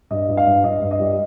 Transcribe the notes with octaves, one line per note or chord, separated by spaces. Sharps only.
G2 D#5
G2
F5
G2
G2 D#5
G2
D#5
G3